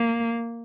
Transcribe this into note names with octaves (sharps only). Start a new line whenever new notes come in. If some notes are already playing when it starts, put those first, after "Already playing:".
Already playing: A#3